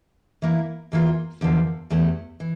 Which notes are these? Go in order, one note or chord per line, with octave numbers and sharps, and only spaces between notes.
E3 A#3 E4
E2 E3 A#3 F4
E2 D3 F3 A#3
E2 E3 A3 E4 G4
E3